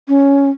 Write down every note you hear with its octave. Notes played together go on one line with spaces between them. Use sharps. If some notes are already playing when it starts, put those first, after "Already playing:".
C#4